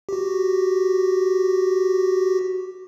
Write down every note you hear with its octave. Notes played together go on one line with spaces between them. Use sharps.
F#4 G4